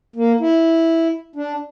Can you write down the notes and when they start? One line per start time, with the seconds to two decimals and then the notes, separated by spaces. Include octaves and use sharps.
0.16 A#3
0.41 E4
1.36 D4